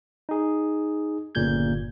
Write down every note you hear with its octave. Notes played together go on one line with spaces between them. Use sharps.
D#4 G#4
G1 A#2 C#3 G6 G#6